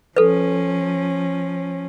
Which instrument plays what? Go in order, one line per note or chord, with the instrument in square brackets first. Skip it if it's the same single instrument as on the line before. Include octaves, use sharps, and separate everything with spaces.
[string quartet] F3 C#4 [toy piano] A4 B4